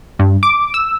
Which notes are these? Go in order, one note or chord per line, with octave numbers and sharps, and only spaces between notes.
G2
D6
E6